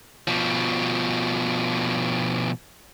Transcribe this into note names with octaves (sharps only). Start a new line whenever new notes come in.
B2 F3